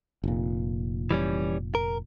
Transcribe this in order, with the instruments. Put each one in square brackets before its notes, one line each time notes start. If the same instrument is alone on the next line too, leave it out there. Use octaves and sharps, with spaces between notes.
[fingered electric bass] F1 A#2
[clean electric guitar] E3 G3 C#4
A#4